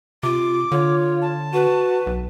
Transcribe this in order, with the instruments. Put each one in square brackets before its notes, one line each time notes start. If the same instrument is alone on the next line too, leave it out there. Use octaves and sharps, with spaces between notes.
[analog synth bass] C3 [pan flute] F4 [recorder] D6
[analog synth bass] D3 [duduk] F4 [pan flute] C#5
[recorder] A5
[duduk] F#4 [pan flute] B4
[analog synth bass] B1